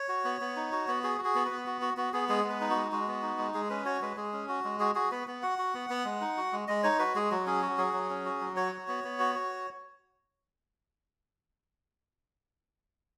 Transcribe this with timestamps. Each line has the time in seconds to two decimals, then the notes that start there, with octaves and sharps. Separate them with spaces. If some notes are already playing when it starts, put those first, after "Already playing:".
Already playing: C#5
0.09 F#4
0.25 B3
0.41 B3
0.56 D#4
0.72 F#4
0.88 B3
1.03 F#4 G#4
1.18 F#4
1.25 G#4
1.35 B3
1.45 B4
1.51 B3
1.67 F#4
1.81 F#4
1.97 B3 F#4
2.13 B3 G#4
2.29 G#3 G#4
2.44 B3
2.50 B4
2.61 D#4
2.70 F#4
2.75 G#3
2.92 G#3 F#4
3.08 B3
3.22 D#4
3.39 G#3
3.54 G#3 G#4
3.70 C#4 B4
3.85 F#4 C#5
4.02 G#3 B4
4.17 G#3 G#4
4.33 C#4
4.49 F#4
4.64 G#3
4.80 F#4 G#4
4.95 F#4 G#4
5.11 B3 B4
5.28 B3
5.42 F#4 F#5
5.59 F#4
5.74 B3
5.90 B3
6.05 G#3
6.21 D#4
6.37 F#4
6.52 G#3
6.68 G#3 D#5
6.83 D#4 C#5
6.99 F#4 B4
7.15 G#3 G#4
7.31 F#3 F#4
7.46 C#4 G#4
7.62 F#4
7.78 F#3 G#4
7.93 F#3
8.10 C#4
8.25 F#4
8.41 F#3
8.56 F#4 C#5
8.72 F#4
8.88 B3
9.04 B3
9.20 F#4
9.35 F#4